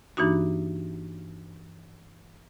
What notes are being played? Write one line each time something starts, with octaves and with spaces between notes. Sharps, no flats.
G2 E3 A#3 D4 D#4 F#4